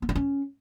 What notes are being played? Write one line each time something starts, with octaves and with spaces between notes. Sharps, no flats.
B3
D4
C#4